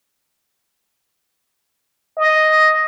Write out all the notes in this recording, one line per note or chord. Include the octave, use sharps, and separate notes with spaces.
D#5